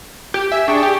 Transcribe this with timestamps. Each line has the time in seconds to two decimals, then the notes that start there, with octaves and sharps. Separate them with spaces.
0.34 G4
0.52 E5 G#5
0.68 D4 G#4 G5 C#6
0.83 G4